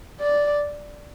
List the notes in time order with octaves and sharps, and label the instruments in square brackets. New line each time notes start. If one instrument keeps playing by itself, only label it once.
[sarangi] D5